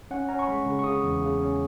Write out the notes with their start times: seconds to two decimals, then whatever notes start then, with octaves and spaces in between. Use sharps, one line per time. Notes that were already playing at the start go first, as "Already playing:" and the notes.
0.11 C#4 F#5
0.29 C#4 A#5
0.39 C#6
0.47 G#3 B5
0.66 C#3
0.79 C#6
0.84 C#3 D#6
1.03 E2
1.22 C#3
1.40 C#4